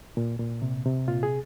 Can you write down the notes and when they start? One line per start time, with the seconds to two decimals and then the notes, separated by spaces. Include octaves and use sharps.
0.17 A#2
0.39 A#2
0.62 C3
0.85 C3
1.08 A#2 F4
1.23 G#4